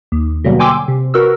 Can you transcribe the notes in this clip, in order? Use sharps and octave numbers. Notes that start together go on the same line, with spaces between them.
D#2
B2 D3 F#3 G3 A#3
G5 G#5 C6 D6 E6
C3
F#4 A#4 B4 E6